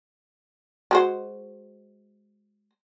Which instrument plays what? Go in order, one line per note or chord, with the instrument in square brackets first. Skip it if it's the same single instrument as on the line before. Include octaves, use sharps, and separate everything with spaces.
[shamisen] G#3 F#4 C5